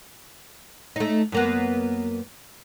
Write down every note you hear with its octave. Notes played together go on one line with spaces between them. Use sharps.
A3 D#4
F#2 A#3 B3